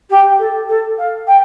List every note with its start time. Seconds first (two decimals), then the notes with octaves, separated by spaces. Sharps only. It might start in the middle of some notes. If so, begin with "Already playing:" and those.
0.10 G4
0.38 A4
0.68 A4
0.97 F5
1.27 G5